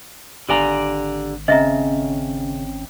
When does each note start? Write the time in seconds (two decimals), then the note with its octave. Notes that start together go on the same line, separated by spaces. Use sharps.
0.49 G#1 D3 G4 D5 F5 G#5 A#5
1.48 C#3 C4 C#4 D#5 E5 A#5